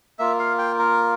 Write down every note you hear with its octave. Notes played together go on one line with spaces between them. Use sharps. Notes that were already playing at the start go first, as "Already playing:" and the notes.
A#3 F4 E5
F5
G5
A#4